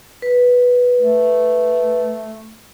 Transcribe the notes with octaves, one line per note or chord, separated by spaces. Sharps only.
B4
A3